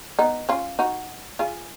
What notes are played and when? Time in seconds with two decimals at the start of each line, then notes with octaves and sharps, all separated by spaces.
0.19 B3 D#4
0.49 C#4 F4
0.79 D#4 F#4
1.39 F4 G#4